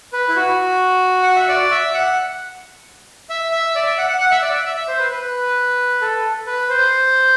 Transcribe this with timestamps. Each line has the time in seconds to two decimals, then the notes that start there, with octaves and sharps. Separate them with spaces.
0.13 B4
0.29 E4
0.36 F#4
1.23 F#5
1.36 E5
1.48 D5
1.71 E5
1.94 F#5
3.30 E5
3.52 E5
3.75 D5
3.86 E5
3.98 F#5
4.09 F#5
4.20 F#5
4.31 E5
4.42 D5
4.54 E5
4.65 E5
4.77 E5
4.88 C5
4.99 B4
5.11 B4
6.02 A4
6.47 B4
6.69 C5